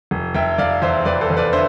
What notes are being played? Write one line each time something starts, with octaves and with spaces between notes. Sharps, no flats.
F1
F1 E5 G5
F1 D5 F5
E2 C5 E5
F1 B4 D5
A4 C5
E2
B4 D5
D3 C5 E5